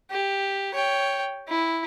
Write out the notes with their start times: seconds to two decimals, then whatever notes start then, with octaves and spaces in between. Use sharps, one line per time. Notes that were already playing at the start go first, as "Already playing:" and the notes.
0.11 G4
0.74 C#5 G5
1.48 E4